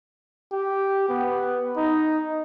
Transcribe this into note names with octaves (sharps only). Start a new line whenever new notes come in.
G4
B3
D#4